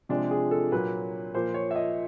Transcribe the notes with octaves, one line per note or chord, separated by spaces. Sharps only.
C3 F3 G#3 D4
G#4
A4
A#2 F#3 A#3 B4
A#2 F3 A#3 C5
C#5
E5
D#5